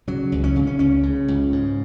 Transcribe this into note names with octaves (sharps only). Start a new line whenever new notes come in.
C#3 F#3
C#2
C#4
C#3
C#4
C#2 C#4
C#3
C#2
G#2